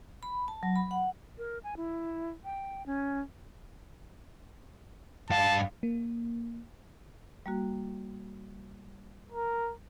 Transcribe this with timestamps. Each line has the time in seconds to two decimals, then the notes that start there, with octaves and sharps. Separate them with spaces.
0.23 B5
0.48 A5
0.63 F#3
0.76 B5
0.91 F#5
1.38 A#4
1.64 G#5
1.77 E4
2.44 G5
2.86 C#4
5.30 G2 F5 A5
5.83 A#3
7.46 G3 A#3 F#4
9.32 A#4